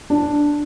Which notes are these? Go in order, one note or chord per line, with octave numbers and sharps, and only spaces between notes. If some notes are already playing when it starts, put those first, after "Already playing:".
D4